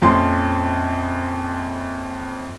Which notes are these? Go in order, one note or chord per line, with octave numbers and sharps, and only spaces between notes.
A#1 F2 F3 C#4 A5 C6